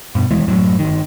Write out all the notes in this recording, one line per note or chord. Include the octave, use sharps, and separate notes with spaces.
G2 B2
E1 D#2 E3 G#3
F#2 A2 F#3
G1 D#3